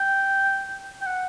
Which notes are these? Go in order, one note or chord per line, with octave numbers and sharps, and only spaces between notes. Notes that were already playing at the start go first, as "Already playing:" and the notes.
Already playing: G5
G5
F#5